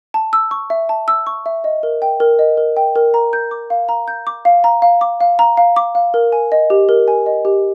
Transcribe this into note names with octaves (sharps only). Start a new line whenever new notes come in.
A5
E6
C#6
E5
A5
E6
C#6
E5
D#5
A#4
G5
A#4
D#5
A#4
G5
A#4
A#5
G6
D6
F5
A#5
G6
D6
F5
A#5
F5
D6
F5
A#5
F5
D6
F5
A#4
G#5
D#5
G4
A#4
G#5
D#5
G4